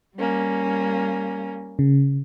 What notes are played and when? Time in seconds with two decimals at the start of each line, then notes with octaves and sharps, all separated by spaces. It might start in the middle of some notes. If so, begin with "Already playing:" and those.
0.17 G3 A#3 C#4
1.79 C#3